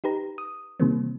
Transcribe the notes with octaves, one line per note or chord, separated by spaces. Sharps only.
D#4 G4 B4 A#5
D#6
C3 D#3 E3 G3 A#3 C4